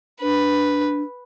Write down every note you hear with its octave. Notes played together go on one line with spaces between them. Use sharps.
D4 B4